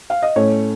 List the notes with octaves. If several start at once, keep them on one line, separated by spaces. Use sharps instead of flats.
F5
D#5
A2 A3 C#4 C#5